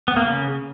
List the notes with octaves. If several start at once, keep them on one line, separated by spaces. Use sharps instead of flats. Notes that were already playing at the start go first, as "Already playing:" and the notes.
B3
A#3
C#3